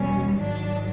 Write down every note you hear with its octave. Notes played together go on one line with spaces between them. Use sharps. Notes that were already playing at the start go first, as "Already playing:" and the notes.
Already playing: E2 B2 G3 C#4
G#2 D#3 F#3 D4